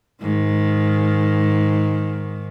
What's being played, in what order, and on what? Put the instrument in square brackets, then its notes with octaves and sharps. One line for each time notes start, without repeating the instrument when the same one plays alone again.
[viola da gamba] G#2 D#3